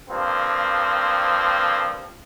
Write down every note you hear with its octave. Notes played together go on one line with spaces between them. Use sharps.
G2 F3 A#3 C4